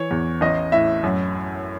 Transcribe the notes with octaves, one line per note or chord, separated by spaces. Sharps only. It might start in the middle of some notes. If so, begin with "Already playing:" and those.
Already playing: E3 C#5
E2
A1 D#5
A2 E5
F#2